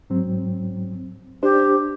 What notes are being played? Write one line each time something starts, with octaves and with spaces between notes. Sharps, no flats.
G#2 F#3 C4
D4 G4 C5